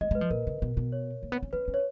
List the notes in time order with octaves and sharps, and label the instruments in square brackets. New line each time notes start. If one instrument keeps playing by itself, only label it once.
[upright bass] G#3 [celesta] D#5
[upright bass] G#3 [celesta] B4
[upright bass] F3
[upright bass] A#2 [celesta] A#4
[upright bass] C#3
B2
B2
[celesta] C#5
[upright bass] A#3
B3
C#4
[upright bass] C#4 [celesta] B4
[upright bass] C#4
[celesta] C#5